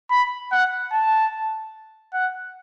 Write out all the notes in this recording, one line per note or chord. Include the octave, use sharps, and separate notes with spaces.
B5
F#5
A5
F#5